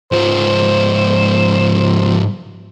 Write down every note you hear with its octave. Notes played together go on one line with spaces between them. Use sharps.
G#2 F3 C5